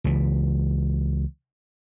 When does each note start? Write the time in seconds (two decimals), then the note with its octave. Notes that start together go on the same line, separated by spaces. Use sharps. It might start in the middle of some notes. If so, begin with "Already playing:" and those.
0.04 C#2 E3